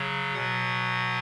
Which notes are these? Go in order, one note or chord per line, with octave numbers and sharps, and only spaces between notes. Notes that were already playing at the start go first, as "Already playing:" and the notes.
Already playing: C#3 F#3
B2 F#3 F#5